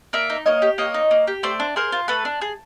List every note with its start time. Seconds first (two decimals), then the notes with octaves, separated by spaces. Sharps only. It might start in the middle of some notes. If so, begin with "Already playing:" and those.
0.13 A#3 D5 E5
0.30 D#4
0.46 A#3 C#5 D#5
0.62 G4
0.78 A#3 C#5 D#5
0.94 D#4
1.11 A#3
1.27 G4
1.43 A3 C5 D5
1.60 D4
1.76 G#4 A#4 C5
1.92 F4
2.08 A3 A4 B4
2.25 D4
2.41 G#4